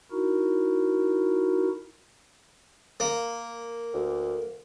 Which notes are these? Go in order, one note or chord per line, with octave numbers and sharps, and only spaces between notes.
D#4 E4 F#4 A#4
A#3
D2